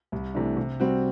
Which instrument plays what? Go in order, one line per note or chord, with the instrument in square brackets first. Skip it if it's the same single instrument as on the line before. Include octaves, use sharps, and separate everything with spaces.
[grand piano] C2
C3 E3 A3 D4
C3
G3 C4 F#4